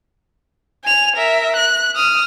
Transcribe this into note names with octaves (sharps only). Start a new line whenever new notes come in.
G#5 F7
A#4 E5
F#6
D#6 F6